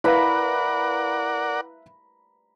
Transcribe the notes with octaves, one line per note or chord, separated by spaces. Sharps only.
E4 A#4 B4 D5 F5 F#5 A#5 B5